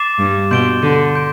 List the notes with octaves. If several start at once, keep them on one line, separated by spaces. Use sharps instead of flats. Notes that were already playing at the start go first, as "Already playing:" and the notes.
Already playing: D6 A6 C7 E7
G2
B2 C6 G6 D7 G7
D3
C6 G6 D7